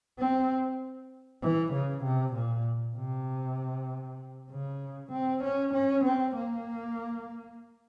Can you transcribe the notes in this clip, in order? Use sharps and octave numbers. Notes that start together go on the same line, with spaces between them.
C4
E3
C#3
C3
A#2
C3
C#3
C4
C#4
C#4
C4
A#3